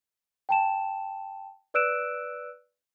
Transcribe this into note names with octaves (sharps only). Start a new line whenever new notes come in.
G5 A5 E7
B4 D5 E6 F#6 D7 E7